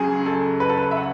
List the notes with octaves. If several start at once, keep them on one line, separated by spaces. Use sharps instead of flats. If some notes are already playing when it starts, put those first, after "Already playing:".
Already playing: C#2 C#3 F#3 G#4
A4
B4
A4
B4
E5
F#5